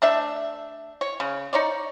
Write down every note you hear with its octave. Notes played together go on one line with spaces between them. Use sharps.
A3 D4 E5
C#5
C#3
D#4 C#5 D5